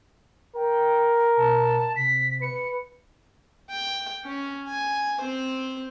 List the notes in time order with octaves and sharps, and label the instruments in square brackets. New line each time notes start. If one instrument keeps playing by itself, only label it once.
[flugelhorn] A#4 [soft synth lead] G5
[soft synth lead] B2 [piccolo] A5
[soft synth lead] C3 [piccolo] B6
[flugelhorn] B4 [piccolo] C#7
[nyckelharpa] G5
C#4
G#5
C4 C5